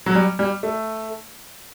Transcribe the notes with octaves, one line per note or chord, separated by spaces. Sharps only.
F#3
G3
G3
A3